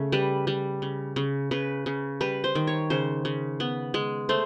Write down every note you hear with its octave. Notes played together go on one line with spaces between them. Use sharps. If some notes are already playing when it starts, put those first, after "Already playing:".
Already playing: C#3 A3
G3 B4
G3
C#3
C#3
C#3 B4
C#3
G3 B4
C5
D#3
C#5
C#3 C5
C#3
B3
G#3
A3 C5